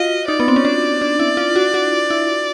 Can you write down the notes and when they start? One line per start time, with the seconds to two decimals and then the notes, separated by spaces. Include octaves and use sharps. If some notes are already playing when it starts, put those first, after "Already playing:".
Already playing: F4 F#4 D#5
0.28 D#4 D5
0.40 B3
0.48 C4
0.56 C#4
0.65 D4
1.02 D4
1.19 E4
1.37 F4
1.56 F#4
1.74 F#4
2.10 E4